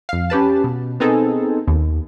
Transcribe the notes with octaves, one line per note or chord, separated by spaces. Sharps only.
F2 F5
C#4 G4 B4 A5
B2
B3 C4 D#4 G#4 A4
D#2